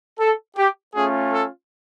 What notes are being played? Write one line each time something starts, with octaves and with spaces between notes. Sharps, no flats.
A4
G4
A3 C#4 F4 G#4
A4